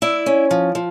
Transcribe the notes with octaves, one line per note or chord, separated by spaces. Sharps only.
E4 D5
C#4
F3
F3